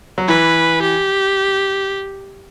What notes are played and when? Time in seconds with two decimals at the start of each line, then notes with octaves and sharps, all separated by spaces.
0.18 F#3
0.28 E3 B4
0.82 G4